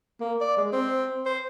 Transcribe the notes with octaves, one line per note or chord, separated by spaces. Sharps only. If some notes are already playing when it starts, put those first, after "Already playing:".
A#3
D5
G#3
C4
C5